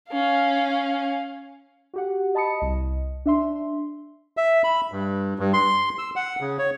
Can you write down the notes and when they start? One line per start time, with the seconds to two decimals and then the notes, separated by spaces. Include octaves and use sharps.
0.10 C#4 F5
1.94 F#4 G4 F#5
2.35 D#5 A5 B5 D#6 C#7
2.60 C2 D#5
3.26 D4 E5 C6
4.37 E5
4.64 B5
4.92 G2
5.39 G2
5.53 C6
5.98 E6
6.16 F#5
6.41 C#3
6.59 C#5